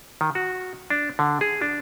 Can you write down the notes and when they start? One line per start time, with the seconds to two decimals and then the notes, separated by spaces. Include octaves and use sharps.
0.21 D#3
0.35 F#4
0.90 D4
1.19 D3
1.41 G#4
1.62 D4